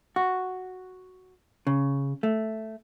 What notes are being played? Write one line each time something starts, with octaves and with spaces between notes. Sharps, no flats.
F#4
C#3
A3